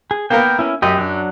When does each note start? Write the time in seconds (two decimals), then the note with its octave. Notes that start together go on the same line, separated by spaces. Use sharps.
0.11 G#4
0.30 A#3 B3 A#4 G5
0.59 C#4 E4
0.82 F#2 G4 D#5
0.98 F#3 D4